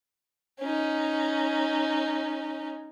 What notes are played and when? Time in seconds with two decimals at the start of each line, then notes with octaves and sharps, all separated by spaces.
0.60 C#4 D#4